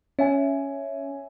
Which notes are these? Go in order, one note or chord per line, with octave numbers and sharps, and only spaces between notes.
C#4 C#5 E5 G#5